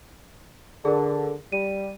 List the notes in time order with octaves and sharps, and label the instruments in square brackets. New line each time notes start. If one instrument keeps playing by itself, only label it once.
[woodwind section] D3 [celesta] G#4 A#4
[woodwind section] G3 [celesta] D#7